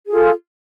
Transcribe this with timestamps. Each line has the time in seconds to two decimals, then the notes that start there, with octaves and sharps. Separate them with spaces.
0.07 G#4
0.10 F4
0.13 A4